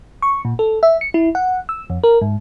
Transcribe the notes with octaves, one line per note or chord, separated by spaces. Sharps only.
C#6
A#2
A4
E5
C#7
E4
F#5
E6
F2
A#4
G#2